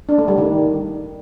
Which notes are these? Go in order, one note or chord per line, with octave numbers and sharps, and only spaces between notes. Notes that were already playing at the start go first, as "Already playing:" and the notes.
D4
A3
G3
D#3